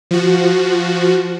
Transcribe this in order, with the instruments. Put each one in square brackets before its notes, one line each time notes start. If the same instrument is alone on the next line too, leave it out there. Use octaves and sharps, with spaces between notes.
[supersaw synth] F3 F#4